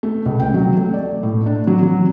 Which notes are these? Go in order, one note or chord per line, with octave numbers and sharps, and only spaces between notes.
A3
C#2
G5
F#3
A3
D5
A2
D4
F#3
F#3